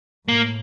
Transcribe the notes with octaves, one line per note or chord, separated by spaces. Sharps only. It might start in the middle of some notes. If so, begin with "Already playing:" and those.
A2 A#3